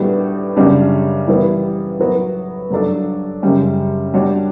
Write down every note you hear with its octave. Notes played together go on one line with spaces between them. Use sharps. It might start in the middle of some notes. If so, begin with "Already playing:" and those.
Already playing: A2 G3 B3 D4 F#4
F#2 C#3 G3 D4 F#4
E3 G3 B3 E4
A2 F#3 B3 F#4
G2 F#3 A3 D4 A4
F#2 C#3 G3 C#4
G3 D4 F#4 C#5